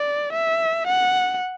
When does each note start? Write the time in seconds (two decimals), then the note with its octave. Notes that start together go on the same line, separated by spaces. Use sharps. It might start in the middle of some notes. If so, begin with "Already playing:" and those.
Already playing: D5
0.33 E5
0.87 F#5